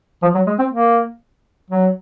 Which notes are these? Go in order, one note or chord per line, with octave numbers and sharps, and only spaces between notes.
F3
F#3
G#3
C4
A#3
F#3